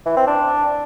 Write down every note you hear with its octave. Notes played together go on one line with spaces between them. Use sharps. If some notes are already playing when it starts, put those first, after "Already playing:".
E3
C4
D4